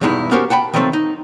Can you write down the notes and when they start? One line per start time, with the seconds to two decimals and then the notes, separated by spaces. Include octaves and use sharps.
0.01 E2 G2 B2 G#3 D#4 E4
0.31 B3 C#4 F#4 G4 A#4 C5
0.50 F#5 G5 A5 B5
0.74 D#3 F3 F#3 A3 C4
0.93 D#4